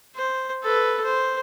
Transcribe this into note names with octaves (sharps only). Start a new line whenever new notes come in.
C5
A4 B4
C5